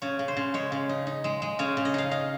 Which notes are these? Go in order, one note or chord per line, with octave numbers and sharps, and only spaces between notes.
C#3 C#5
C#3
C5
C#3
G#3 C#5
C#3
D#4
D#4
G#3
G#3
C#3 C#5
C#3
D#5
D#4 F5
D#4 F5